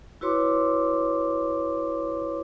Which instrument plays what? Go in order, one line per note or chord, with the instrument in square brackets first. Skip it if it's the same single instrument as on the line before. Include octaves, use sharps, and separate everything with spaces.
[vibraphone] E4 F#4 B4 C#5 C6 D6